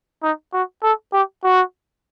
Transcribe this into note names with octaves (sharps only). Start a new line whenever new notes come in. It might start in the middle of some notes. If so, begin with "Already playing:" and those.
D#4
F#4
A4
G4
F#4